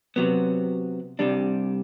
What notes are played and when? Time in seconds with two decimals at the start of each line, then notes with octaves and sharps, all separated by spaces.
0.16 C3 F#3 B3
1.19 C2 C3 G3 D4